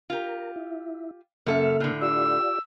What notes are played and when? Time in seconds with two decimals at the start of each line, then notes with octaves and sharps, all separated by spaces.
0.10 F4 G4 A#4
0.56 E4
1.46 F#2 C#3 A#3 A4 E5 F6
1.80 A2 D3
2.01 F4 G4 D5 E6